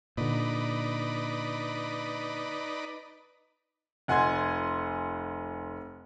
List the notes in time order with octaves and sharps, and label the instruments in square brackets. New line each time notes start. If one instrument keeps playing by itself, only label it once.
[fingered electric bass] A#2 D3 [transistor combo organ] D#4 B4 D5
[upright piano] F1 F#5 G#5 C6 G#6